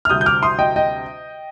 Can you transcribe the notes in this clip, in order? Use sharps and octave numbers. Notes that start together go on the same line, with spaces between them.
F6
D2 C3 G3 D#6 G6
G6
D6 F6
C6 D#6
D#5 G5
D#5 G5